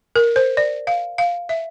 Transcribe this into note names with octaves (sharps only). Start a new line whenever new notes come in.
A#4
C5
D5
F5
F5
E5